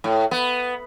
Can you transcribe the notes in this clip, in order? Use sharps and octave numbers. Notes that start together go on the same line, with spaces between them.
A2
B3